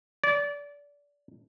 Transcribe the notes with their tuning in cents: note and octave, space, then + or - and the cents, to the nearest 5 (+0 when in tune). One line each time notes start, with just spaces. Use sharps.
D5 -25